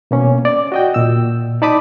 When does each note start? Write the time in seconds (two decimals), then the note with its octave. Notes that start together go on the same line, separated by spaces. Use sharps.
0.11 B2 A#3 C#4
0.45 D5
0.72 F#4 D#5 G5
0.94 A#2 E6
1.62 D#4 D5 A5 B5 D6 D#6